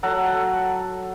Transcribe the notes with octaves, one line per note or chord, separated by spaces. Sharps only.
F#3 A4 F#5 A#5